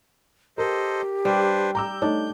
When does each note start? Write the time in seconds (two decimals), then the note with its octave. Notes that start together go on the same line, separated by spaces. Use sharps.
0.58 G4 A4 A#4 C5 D#5
1.25 G3 D4 B4 C5
1.75 A#5 D6 E6 G6
2.02 A3 D4 D#4 C#5